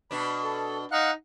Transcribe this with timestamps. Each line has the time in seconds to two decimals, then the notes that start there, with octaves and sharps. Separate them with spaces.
0.11 B2 D4 B5
0.43 A4
0.92 D#4 F5 F#5 F#6